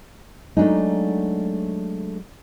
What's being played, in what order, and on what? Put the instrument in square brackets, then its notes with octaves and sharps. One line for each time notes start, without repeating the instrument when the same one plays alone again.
[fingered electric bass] F#3 G#3 [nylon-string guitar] A3 D4 D#4